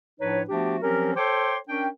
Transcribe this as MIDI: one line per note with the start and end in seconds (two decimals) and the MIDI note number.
0.20 0.43 45
0.20 0.43 53
0.20 0.43 62
0.20 0.43 63
0.20 0.43 71
0.20 0.43 73
0.50 0.78 53
0.50 0.78 57
0.50 0.78 59
0.50 0.78 62
0.50 0.78 66
0.50 0.78 67
0.83 1.13 53
0.83 1.13 54
0.83 1.13 60
0.83 1.13 61
0.83 1.13 67
0.83 1.13 70
1.16 1.58 69
1.16 1.58 72
1.16 1.58 73
1.16 1.58 79
1.16 1.58 84
1.16 1.58 86
1.68 1.88 61
1.68 1.88 62
1.68 1.88 70
1.68 1.88 79